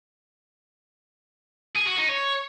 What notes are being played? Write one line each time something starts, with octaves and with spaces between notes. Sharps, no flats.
G#4
F#4
D#4
C#5